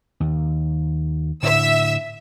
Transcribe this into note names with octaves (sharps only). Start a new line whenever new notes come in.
D#2
A2 D3 E5 E6